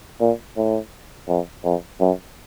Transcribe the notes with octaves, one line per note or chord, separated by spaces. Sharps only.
A#2
A2
F2
F2
F#2